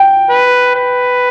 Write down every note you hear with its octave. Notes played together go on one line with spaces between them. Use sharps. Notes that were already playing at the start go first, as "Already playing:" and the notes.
Already playing: G5
B4
B4